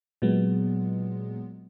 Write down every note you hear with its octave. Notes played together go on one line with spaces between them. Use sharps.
A#2 F#3 G#3 B3